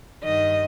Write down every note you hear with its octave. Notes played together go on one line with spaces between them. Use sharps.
G2 D#3 D#5